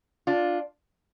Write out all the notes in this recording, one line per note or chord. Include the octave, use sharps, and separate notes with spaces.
D4 F4